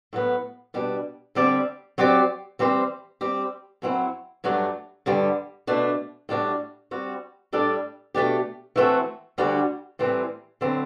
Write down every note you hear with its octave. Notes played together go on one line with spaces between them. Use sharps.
A2 F#3 B3
B2 G3 D4
D3 G3 C4 G4 D5
F#3 C4 G4 D5
E3 G3 C4 G4 C5
G3 C4 G4
F#2 F#3 C4 E4
G2 F#3 A3 D4
G2 D3 G3
B2 A3 D4
A2 G3 D4 F#4
G3 C4 F#4
A2 G3 D4 A4 D5
B2 A3 D4 G4
E3 A3 C4 F#4 A4
D2 D3 G3 D4 F#4
A2 E3 G3 C4
D3 F#3 C4 E4